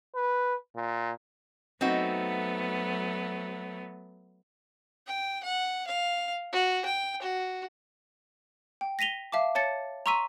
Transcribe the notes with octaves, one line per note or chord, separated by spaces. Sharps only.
B4
A#2
F#3 A3 B3 C4 D#4 F#4
G5
F#5
F5
F#4
G5
F#4
G5
A#6 B6 D#7 F7 G7
E5 F5 A5 D6
C#5 A5 A6 C#7
A#5 C6 C#6 E6 B6 D#7